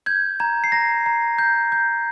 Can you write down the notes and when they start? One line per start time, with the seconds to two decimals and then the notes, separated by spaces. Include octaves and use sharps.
0.06 G6 G#6
0.40 A#5 G#6
0.64 C7
0.72 A#5 A#6
1.06 A#5
1.38 G6
1.72 G6